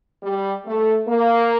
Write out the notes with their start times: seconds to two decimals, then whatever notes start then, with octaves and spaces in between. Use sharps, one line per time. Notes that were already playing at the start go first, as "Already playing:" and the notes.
0.23 G3
0.66 A3
1.08 A#3